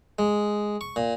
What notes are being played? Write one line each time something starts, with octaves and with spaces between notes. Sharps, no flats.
G#3
C#6
A#2